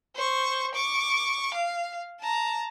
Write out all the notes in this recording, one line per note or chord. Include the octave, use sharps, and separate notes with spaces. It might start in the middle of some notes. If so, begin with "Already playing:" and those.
C5 C#6
C#6 D6
F5
A5 A#5